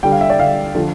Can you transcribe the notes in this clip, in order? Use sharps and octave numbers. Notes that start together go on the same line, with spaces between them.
D3 G3 G5
F5
E5
D5
D3 G3 F5
D3 F3 A3